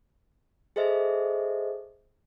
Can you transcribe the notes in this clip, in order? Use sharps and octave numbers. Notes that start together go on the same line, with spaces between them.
G#4 A4 C5 D#5 E5